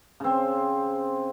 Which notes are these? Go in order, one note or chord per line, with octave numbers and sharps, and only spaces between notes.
C#3 C4